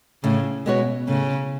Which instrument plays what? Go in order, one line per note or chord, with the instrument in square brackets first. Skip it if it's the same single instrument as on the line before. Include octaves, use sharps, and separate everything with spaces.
[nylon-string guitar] A2 [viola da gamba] C#3
[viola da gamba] B2 [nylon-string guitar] G#3 B3 F#4 C#5
[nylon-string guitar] A2 [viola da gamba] C#3